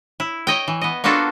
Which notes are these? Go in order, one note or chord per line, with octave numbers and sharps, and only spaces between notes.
E4
C#5 D#5 G5
E3
B3 D#5
A#3 B3 D4 F4 F#4 A4